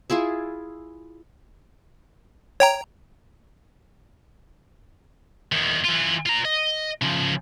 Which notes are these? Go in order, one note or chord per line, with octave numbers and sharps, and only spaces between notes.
E4 F4 G#4 E5
C#5 G5 A#5
E2 D#3
E3 F4
F4 A#5
D#5
C#3 F3